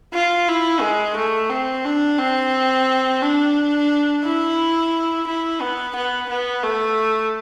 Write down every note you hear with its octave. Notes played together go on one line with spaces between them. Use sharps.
F4
E4
G#3
A3
C4
D4
C4
D4
E4
E4
B3
B3
B3
A3